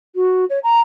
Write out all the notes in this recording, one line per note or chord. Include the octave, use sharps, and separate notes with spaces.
F#4
C#5
A#5